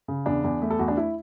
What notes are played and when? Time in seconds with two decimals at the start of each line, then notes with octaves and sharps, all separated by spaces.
0.08 C#3
0.26 E2 D4
0.44 E2
0.62 A3
0.70 A4
0.79 E2 F#4
0.88 D4
0.97 E4